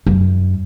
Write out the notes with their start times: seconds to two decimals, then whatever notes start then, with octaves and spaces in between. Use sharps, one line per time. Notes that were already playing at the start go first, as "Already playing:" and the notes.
0.06 F#2